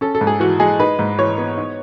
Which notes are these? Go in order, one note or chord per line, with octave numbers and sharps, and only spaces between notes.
C#4 A4
A4
G#2
G#4
E3 F#4
G#3 G#4
D#4 B4
G#2
E3 C#5
B3
D#4